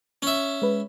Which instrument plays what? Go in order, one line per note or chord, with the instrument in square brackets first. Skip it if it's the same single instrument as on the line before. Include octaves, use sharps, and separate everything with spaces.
[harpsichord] C#4 E5
[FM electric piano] G#3 B4